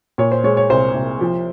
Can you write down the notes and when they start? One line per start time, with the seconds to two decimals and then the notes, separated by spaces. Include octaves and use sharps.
0.18 A#2 C#5
0.32 C5
0.44 G#3 C#5
0.57 C#5
0.70 C2 C5
0.95 C2
1.21 F3